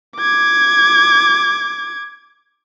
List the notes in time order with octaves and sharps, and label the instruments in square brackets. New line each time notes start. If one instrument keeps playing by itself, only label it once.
[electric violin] D6 G#6